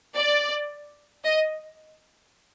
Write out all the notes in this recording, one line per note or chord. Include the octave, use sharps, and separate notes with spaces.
D5
D#5